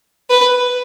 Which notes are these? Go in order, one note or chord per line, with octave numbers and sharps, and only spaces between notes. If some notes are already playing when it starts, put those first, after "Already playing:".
B4